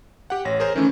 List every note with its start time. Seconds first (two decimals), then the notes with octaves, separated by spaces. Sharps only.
0.30 G4 F#5
0.45 A1 C#5 A#6
0.60 G#4 A#4 C5
0.76 D#3 E3 A3 C#4